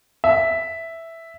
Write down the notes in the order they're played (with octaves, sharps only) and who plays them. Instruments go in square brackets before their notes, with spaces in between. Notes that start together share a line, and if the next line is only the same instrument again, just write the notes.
[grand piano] E5